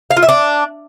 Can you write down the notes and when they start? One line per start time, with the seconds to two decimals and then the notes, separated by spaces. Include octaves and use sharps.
0.11 F5
0.17 F4
0.23 E5
0.29 D4